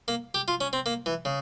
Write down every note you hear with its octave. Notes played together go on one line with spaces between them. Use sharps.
A#3
G4
F4
C#4
C4
A#3
E3
C#3